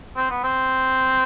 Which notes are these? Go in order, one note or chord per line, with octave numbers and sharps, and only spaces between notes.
C4
B3
C4